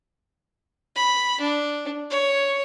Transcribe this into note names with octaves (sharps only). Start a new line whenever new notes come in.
B5
D4
C#5